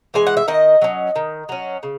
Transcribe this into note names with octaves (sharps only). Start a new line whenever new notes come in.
E3 G#3 G#5
F#5
E5
D#3 D#5
F#3 C#4
D#3
F#3 C#4
C#3